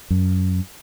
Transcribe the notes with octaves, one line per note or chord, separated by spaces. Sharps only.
F#2